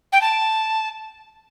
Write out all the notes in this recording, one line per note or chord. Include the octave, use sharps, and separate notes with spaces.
G5
A5